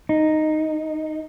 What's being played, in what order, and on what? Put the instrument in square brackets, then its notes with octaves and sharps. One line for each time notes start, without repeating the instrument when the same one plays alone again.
[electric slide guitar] D#4